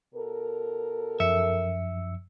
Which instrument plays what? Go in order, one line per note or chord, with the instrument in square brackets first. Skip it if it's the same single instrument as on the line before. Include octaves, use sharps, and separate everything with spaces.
[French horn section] B2 A4 A#4
[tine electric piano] F#2 F3 C#7 [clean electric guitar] E5